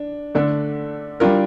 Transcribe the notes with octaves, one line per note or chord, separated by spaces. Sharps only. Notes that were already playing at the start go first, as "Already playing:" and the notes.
Already playing: D4
D3 A3 D4 A4 D5
G3 D4 F4 A#4